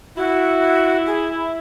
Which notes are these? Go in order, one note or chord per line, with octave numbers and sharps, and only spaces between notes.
E4 F#4
G#4